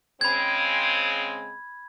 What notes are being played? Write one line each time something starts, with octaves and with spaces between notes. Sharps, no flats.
C#3 G#3 C4 B5 G#6